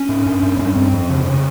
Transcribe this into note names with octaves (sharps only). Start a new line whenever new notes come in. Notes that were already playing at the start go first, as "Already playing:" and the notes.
Already playing: C#4
G#2
G2
G2
G2 C#4
G2 C4
F2
C#3
C#3